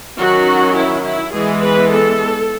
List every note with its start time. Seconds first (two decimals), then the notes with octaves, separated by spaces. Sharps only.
0.19 D#3 F#3 C#4 F#4
0.76 E4
1.05 E4
1.34 E3 G#3 B3 G#4
1.63 B4
1.91 A4